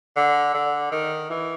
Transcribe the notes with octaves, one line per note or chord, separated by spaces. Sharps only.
D3
D3
D#3
E3